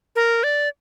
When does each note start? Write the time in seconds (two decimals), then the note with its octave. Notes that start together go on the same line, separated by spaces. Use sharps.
0.16 A#4
0.44 D5